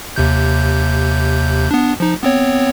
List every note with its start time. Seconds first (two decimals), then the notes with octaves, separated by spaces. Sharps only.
0.16 D#2 C3 G6
1.71 B3 D4
2.00 F3 D#4
2.23 B3 C4 C#5